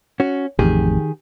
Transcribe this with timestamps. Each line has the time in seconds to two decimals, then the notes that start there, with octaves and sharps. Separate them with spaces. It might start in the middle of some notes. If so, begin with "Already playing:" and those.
0.20 C#4 F#4
0.59 A1 F2 D#3 G4 G#4